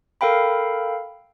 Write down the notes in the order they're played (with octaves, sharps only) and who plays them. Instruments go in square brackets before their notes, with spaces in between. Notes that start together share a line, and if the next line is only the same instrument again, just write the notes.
[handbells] A4 A#4 F5 G5 B5